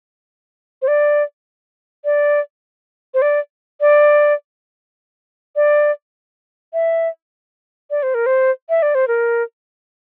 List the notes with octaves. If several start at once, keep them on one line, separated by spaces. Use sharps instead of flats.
C5
D5
D5
C5
D5
D5
D5
E5
D5
C5
A#4
C5
E5
D5
C5
A#4